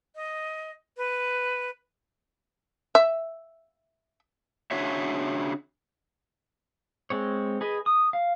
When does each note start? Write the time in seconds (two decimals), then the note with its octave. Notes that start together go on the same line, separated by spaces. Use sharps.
0.15 D#5
0.97 B4
2.95 E5
4.71 C#3 D4 F#4 C#5 E5
7.10 G#3 C4 C#5
7.61 G#4 B4 D#5
7.86 D#6
8.13 F5